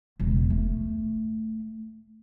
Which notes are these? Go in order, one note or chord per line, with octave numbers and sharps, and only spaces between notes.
E1 C#2
A3